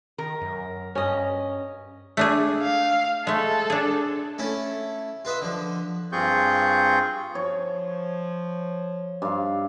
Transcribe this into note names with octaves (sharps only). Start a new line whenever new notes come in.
D#3 A#4
F#2
G2 C#4 D#5
A3 D4 G#4
F5
G#3 A3 A4
D4 G#4
A3 C#4 E4 A4
F4 B4 D#5 E5
D3 F3
G2 C4 F4 G#4 C#6 G6
F3 C#5
G2 F5